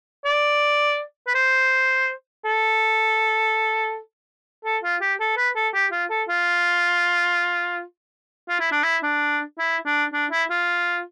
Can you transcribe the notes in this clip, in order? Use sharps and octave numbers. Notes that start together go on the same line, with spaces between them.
D5
B4
C5
A4
A4
F4
G4
A4
B4
A4
G4
F4
A4
F4
F4
E4
D4
E4
D4
E4
D4
D4
E4
F4